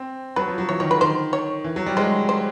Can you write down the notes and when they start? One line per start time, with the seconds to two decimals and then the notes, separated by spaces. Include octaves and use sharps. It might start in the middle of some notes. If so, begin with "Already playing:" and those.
Already playing: C4
0.36 F#3 B4
0.48 F3
0.58 F#3
0.69 E3 C#5
0.80 D#3 C#5
0.90 D3 B4
1.01 D#3 C5
1.33 C#5
1.64 E3
1.76 F#3
1.86 G3
1.97 G#3 C5
2.29 C5